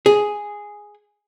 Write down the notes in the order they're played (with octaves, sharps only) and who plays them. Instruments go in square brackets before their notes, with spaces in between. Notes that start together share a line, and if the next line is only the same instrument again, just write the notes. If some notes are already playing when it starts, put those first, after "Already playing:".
[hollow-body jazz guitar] G#4